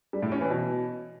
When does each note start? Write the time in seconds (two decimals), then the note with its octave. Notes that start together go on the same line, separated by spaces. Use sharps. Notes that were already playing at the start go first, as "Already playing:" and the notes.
0.13 G3
0.22 A2
0.32 C#4
0.41 E3
0.50 B2